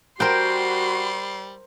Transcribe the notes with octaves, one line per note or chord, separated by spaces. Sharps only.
G3 F#4 A#4 C5 G5 C6